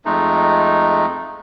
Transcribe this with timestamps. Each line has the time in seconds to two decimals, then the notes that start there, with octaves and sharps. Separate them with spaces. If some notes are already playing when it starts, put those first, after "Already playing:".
0.05 F2 G#3 A3 D#4